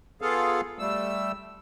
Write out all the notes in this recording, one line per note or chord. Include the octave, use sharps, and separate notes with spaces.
B3 F4 G#4 A4 F5
G3 A3 E6